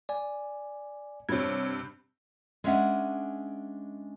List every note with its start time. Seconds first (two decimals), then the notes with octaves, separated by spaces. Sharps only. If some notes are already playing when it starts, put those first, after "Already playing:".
0.09 D5 G#5
1.29 G2 C3 C#5 G#6
2.64 G#3 C#4 D4 E5 F#5